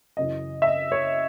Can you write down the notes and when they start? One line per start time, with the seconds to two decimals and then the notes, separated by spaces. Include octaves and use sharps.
0.17 F#2 C#3 E3 D#5
0.62 E5
0.67 D#5
0.92 C#5